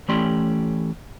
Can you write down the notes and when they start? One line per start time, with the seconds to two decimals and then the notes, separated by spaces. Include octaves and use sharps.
0.08 E3 A3 C#4 G4 D5 C6